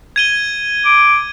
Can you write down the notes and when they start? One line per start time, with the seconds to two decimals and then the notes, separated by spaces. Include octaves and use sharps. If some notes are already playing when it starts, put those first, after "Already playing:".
0.16 G#6 D#7 G7
0.85 D6